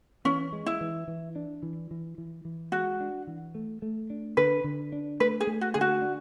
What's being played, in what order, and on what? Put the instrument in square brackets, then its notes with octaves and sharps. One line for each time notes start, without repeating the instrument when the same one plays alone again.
[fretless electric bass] E3 [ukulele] C#4
[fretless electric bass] G#3
[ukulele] E4
[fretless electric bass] E3
E3
D4
E3
E3
E3
E3
[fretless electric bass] G#3 [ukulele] F#4
[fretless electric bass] D4
E3
A3
A3
D4
[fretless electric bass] D3 [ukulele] B4
[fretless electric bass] D3
D4
[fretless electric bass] A3 [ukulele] B4
[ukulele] G#4
[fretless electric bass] A3
[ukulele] F#4
[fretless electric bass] D3 [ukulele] G#4
[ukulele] F#4
[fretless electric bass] D4